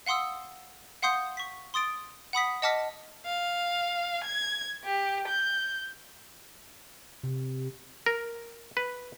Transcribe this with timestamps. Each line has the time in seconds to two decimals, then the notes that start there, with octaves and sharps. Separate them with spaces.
0.06 F5 F#5 C6 D#6 E6
1.02 F5 F#5 C6 D#6 G6 C#7
1.37 C#6 B6
1.74 C6 D#6 A6 D7
2.33 F#5 B5 D#6 B6
2.62 D#5 F#5 A5 D6 F6 B6
3.26 F5
4.24 G#6
4.85 G4
5.28 G6
7.23 C3
8.06 A#4
8.77 B4